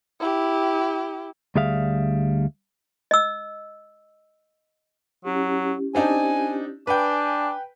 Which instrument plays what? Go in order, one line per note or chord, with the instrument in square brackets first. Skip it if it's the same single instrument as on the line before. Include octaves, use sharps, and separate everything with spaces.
[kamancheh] E4 G4
[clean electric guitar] D2 G3 G#4 E5 F5
[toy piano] D#5 E6
[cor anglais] F#3 [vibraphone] C#4 E4 G4
[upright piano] C4 D4 D#4 [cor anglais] G#5
[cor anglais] D4 [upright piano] B4 G5 [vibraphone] G#5